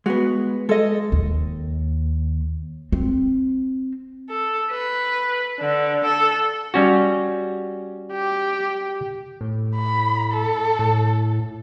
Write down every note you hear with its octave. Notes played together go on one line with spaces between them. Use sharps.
G#3 B3 F#4
G#3 A4 D#5
D#2
C4
A4
B4
D3
A4
G3 C#4 F#4
G4
A2
B5
A4
A2